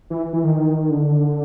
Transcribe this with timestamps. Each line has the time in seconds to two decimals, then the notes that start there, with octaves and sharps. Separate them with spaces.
0.10 E3
0.33 E3
0.44 D#3
0.90 D3